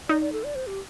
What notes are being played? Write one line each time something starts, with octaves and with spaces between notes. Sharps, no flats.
D#4 D5
D5
A4
D5
C5
G4